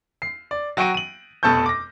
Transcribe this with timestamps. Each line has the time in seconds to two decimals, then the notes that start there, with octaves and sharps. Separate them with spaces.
0.22 C7
0.51 D5
0.77 F#3 F#4 G5 C#6 D7 D#7
0.94 D#7 F#7
1.43 F1 B2 A4 A5 C#6 G6
1.66 D6 A#6